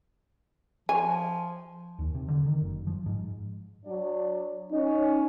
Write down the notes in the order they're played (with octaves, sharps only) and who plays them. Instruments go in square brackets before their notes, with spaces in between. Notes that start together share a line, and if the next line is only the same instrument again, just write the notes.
[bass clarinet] F3 [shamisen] G#5
[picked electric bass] D#2
C3
D3
D#3
F#1
F3
G#2
[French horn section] F#3 D4 D5
[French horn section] C#4 [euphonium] D#4